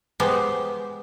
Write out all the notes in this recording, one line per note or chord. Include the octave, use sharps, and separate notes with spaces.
G#3 B3 G4 C5